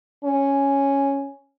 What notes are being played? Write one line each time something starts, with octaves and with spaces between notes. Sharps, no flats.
C#4